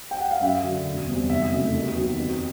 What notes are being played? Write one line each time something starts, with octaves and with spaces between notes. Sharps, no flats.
G5
F#5
F5
F#2 E5
D3 F#3
E1
E2 B2 G3 C4
F1 E5
F2 C#3 F#3 A3
D#2
D#3 F#3 B3
F2